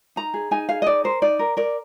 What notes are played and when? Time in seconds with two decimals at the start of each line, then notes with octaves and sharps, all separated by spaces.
0.16 D#4 A#5
0.34 G#4
0.51 D#4 G#5
0.69 G#4 F5
0.82 D#5
0.87 D#4 D5
1.04 A#4 C5
1.22 D#4 D5
1.39 A#4
1.57 A#4 D5